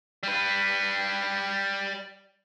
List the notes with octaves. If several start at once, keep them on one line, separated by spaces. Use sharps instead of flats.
G3 B4